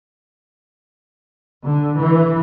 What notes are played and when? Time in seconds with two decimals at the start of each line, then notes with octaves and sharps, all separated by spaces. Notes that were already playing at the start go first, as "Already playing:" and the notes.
1.66 D3
1.99 E3